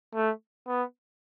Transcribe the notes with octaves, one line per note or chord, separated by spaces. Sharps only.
A3
B3